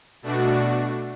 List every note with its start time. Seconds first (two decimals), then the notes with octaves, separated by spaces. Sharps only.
0.22 B2 A3 D4 F#4